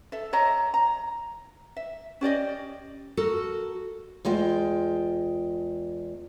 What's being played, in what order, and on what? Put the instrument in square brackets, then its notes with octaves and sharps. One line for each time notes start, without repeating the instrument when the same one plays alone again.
[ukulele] A4 E5
C#5 D#5 E5 A#5
A#5
E5
C#4 G4 D5 D#5
[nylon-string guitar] F#4 A4 A#4
[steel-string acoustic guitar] E2 G#3 F4 G5